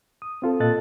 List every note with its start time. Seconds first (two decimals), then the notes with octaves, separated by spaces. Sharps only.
0.22 D#6
0.42 C4 F4 A4
0.60 A#2 A4 D#5 F#6 A6